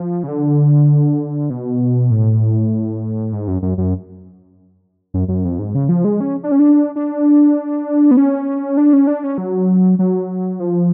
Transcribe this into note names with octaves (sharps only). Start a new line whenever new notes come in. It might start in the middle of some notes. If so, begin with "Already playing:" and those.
Already playing: F3
C#3
D3
B2
A2
G#2
F#2
F#2
F#2
F#2
F#2
F2
G#2
C#3
F3
G#3
C#4
D4
C#4
D4
D4
B3
C#4
D4
C#4
D4
C#4
F#3
F#3
F3